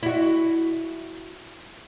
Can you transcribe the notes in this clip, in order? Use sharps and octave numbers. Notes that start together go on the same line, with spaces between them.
E4 F#4